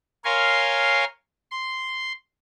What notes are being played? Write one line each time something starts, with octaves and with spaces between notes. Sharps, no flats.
A#4 C#5 F5 G#5 C6
C6